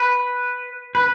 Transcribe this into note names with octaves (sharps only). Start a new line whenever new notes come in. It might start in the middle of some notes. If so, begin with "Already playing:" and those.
Already playing: B4
B4